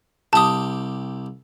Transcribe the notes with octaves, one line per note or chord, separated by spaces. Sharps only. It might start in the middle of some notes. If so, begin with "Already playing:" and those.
C2 G4 A5 D#6